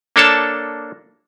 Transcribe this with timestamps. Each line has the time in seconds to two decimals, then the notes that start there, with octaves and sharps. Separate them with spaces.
0.16 A#3 D4 A4 C#5 A5